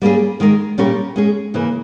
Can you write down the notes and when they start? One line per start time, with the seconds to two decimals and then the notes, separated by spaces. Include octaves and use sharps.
0.02 G3 A#3 C#4 G#4
0.40 D#3 G#3 D#4 A#4
0.78 A#2 G3 C#4 G4 A#4
1.16 G#3 C#4 G#4
1.54 C#3 E3 A#3